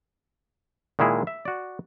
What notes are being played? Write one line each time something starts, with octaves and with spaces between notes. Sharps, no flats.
A#2 D#3 G#3 E4 G#4
E5
F#4 D5